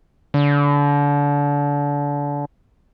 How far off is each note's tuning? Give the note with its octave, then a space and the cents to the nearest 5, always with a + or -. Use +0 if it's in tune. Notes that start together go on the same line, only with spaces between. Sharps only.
D3 -30